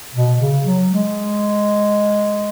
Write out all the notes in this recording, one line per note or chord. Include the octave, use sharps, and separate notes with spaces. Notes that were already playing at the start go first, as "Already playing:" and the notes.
B2
C#3
F#3
G#3